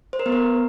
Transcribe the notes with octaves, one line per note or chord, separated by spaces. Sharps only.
C5
A#4
B3
A#4